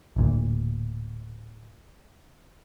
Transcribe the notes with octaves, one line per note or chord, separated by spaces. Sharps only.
D1 D2 A#2